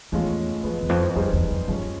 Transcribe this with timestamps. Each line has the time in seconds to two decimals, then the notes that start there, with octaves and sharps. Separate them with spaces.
0.12 E2 A2 F3 G#3 C#4 F4
0.63 E2 F3 G#3 B3
0.82 E2
0.89 F2
1.15 F2 G3 B3 D#4 G#4 C5
1.33 E2
1.51 F2
1.67 F#2 F3 G#3 C#4